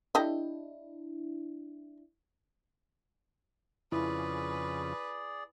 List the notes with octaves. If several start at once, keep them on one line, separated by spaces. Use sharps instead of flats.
D4 E4 G4 A4 D#5
F2 C#3 E4 G#4 B4 D5